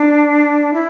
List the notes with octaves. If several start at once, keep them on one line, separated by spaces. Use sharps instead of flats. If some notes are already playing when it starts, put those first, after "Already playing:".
Already playing: D4
E4